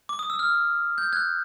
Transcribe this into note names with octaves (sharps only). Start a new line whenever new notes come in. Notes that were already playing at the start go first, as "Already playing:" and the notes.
D6
D#6
E6
F6
G6
F#6 G#6